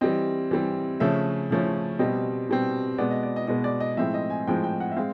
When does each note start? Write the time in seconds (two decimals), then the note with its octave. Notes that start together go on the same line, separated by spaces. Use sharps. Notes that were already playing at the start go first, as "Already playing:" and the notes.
0.01 E3 G3 C4 D#5
0.51 E3 G3 C4
1.00 C#3 F3 A3 C#4 E5
1.51 C#3 F3 A3 C#4
1.99 B2 G3 C4 D#5
2.49 B2 G3 C4
2.98 B2 G#3 B3 D5
3.11 D#5
3.23 D5
3.36 D#5
3.47 B2 G#3 B3 D#5
3.64 D5
3.80 D#5
3.97 A2 F3 G#3 C4 E5
4.14 D#5
4.30 G#5
4.47 A2 F3 G#3 C4 G5
4.64 G5
4.80 F#5
4.92 E5
4.97 G#3 C4 F5